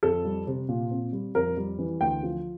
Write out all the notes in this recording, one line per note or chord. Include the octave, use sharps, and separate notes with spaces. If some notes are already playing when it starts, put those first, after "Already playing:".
F2 A4
G3
C3
A#2
C4
G3
F2 A#4
G3
E3
D2 G5
F3